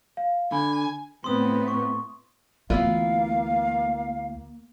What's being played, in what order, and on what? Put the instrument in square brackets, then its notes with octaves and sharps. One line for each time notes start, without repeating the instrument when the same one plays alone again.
[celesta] F5
[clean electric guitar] D3 [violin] G#5 [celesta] B5
[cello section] A2 B3 [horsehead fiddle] C4 B4 [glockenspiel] C6 D#6
[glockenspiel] C#6
[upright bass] D2 E3 [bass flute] A#3 [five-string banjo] B3 E4 F4 [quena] F5